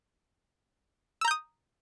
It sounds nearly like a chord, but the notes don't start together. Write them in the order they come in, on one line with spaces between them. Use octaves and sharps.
E6 A#5 G6 D#6